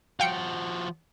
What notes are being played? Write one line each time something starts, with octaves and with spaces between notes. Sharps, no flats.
F3 F#4 F5 G5 C#7